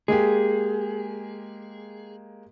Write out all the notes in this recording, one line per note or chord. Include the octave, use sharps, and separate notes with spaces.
G#3 A#3 G4 G#4